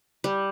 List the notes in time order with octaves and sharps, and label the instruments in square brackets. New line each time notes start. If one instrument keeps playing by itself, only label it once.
[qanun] G3